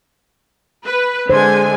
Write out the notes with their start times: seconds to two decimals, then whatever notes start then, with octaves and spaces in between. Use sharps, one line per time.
0.85 B4
1.30 D3 G#3 C5 G#5